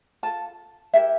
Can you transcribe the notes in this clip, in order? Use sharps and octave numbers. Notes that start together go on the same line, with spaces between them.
F4 A4 A5
E4 G4 A#4 E5